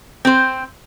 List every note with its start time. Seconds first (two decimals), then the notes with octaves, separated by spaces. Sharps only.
0.25 C4 C5